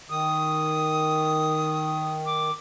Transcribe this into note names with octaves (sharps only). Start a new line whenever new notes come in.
D#3 D#6
D6